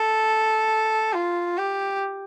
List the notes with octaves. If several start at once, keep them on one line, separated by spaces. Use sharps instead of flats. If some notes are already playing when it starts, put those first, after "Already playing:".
Already playing: A4
F4
G4